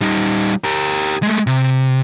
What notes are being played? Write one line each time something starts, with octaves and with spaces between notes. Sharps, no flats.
G3 D#4
G4 A#4
G#3 A3
C3